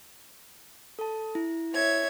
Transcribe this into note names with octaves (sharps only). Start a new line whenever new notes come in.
A4 A5
E4
C#5 E5 G#6